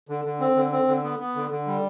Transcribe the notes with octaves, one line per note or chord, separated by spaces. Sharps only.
D3
D3
C4
D3
C4
D3
B3
B3
D3
D3
G3